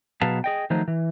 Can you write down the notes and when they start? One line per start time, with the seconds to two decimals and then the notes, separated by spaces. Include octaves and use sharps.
0.21 B2 F#3 G#4 B4 F5 A5
0.44 G#4 D#5 G5
0.70 D#3 F3 F#3 A3 D#4 C5
0.88 E3